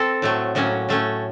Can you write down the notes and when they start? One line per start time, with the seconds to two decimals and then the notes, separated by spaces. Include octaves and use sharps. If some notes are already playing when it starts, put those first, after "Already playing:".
Already playing: C4 A4
0.22 A2 F#3 A3
0.55 A2 F#3 A#3 C#4
0.89 A2 A3 C#4